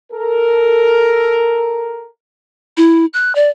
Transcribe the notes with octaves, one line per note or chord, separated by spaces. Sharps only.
A4 A#4
E4
F#6
D5